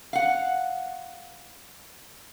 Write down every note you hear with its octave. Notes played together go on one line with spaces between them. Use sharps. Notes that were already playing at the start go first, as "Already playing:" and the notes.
F5 F#5